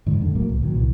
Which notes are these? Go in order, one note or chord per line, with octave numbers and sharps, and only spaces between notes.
G#2 D3 D#3 G#3
F2 A2 D3
E1 A2 F#3 A#3
C#2
A#1 A#2 D#3 F#3
C2 E3